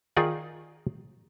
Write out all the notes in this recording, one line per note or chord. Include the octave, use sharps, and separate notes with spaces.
D#3 D#4 F4 G#4 D5 G#5